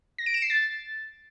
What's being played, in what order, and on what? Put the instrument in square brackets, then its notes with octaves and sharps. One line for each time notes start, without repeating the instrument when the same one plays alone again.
[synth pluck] A#6
D7
E7
C7
A6